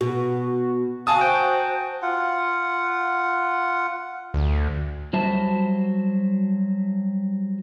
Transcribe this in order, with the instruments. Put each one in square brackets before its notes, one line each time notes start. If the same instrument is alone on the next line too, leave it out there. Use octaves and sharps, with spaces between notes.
[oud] B2 [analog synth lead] F#4
[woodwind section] F#4 [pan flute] F5 [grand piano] G#5 A5 D#6
[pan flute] C5 [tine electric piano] G5
[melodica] F4 F#5
[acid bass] D2
[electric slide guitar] F#3 G3 F#4 C5 E5 A5